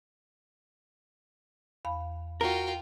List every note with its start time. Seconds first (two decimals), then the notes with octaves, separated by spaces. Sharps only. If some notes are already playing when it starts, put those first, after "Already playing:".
1.85 E2 F5 B5
2.41 F4 F#4 A#4 G5